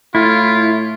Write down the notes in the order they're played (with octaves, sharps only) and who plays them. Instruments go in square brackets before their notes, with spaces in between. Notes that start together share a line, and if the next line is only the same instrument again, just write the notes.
[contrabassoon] A2 [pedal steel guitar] E4 [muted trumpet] F4